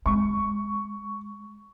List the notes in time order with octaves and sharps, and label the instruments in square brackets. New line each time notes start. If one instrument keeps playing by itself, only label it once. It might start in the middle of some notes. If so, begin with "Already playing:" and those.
[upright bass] G#3 [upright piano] C#6